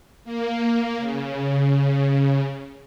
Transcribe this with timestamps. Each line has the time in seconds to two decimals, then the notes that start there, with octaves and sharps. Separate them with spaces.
0.25 A#3
0.98 C#3